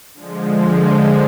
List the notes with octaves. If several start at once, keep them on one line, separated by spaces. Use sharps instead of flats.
D3 F3 G#3